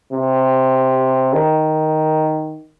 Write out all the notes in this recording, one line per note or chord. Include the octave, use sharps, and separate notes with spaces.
C3
D#3